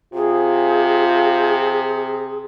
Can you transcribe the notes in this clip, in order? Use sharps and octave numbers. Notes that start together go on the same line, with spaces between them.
C3 F4 G#4